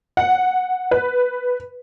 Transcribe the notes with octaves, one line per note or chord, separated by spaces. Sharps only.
F#5
B4